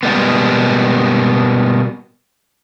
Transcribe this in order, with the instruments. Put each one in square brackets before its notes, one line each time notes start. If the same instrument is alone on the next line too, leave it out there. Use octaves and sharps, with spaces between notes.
[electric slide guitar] B2 G3 G#3 A#3 B3